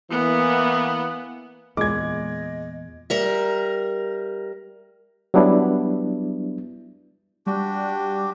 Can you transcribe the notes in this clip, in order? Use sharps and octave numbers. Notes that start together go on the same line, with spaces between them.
E3 A#3 B3
E2 A#2 G#3 D#5 D6 G#6
G3 A#4 E5
F#3 G3 B3 D4 E4
G3 D4 F#4 G4